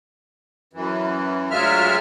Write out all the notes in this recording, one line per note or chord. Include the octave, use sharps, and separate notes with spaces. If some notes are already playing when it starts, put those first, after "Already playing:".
F#2 E3
D2 F#3 G#3 F4 E5 F6